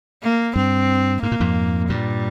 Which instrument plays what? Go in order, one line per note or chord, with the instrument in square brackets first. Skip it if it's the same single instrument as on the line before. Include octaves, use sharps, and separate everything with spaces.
[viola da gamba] A#3
[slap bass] G2 [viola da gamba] C4
[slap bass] G#2 [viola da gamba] A#3
[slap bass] A#2
F2 G#2
[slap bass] G2 A#2 [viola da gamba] G3